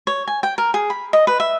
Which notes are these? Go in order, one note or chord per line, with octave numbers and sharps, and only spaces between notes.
C#5
G#5
G5
A#4
G#4
B5
D#5
B4
E5